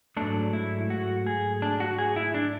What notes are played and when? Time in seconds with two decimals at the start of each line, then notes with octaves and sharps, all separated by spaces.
0.17 G#2 F#3 A3 D4
0.53 E4
0.90 F#4
1.27 G#4
1.62 D4
1.80 F#4
1.99 G#4
2.16 E4
2.34 D4